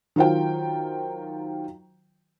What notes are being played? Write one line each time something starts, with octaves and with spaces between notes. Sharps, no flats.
D#3 F#3 F4 C5 G5